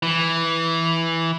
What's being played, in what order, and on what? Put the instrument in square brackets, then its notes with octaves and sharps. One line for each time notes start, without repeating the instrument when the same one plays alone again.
[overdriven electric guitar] E3